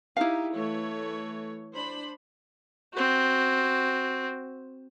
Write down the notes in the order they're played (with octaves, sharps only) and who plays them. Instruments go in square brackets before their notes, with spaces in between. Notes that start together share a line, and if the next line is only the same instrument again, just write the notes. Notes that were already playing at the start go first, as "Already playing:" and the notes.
[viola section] D#4 G4 [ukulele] E4 F5
[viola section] E3 A3 C#5
D4 C5 B5
[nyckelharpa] C4 F#4